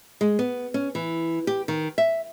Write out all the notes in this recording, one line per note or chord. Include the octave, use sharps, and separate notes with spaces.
G#3
B3
C#4
E3
G4
D#3
E5